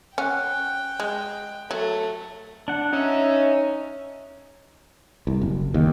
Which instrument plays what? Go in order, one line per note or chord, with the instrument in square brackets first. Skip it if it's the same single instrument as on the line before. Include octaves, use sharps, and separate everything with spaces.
[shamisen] C#4 [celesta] F#5 F#6 [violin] G5
[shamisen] G#3
[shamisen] F#3 [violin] A3
[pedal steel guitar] D4 F#5
[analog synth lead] C#4 [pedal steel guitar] D#4 E5
[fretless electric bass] C2
F#1
D#2